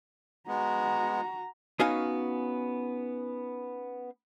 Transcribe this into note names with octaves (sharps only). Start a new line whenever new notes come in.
G#3 B3 F#4 A#5
B3 C#4 D#4 F#4 F5 G#5